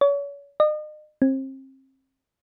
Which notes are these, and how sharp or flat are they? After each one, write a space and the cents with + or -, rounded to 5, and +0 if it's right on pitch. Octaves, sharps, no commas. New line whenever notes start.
C#5 +35
D#5 -40
C4 +30